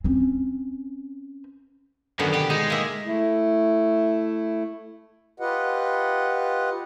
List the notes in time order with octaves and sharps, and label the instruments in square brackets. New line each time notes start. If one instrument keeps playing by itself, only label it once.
[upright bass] C4 C#4
[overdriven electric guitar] F#2 [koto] D3 D#3 B3
[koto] B2 [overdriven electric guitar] G4
[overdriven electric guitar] G#3 [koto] D#4
[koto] A#3 E5
[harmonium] A3 E4
F4 G4 B4 D#5 F#5